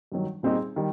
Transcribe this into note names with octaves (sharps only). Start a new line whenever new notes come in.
G2 D#3 F#3
A#2 G3 C4 D#4 G#4
D#3 G3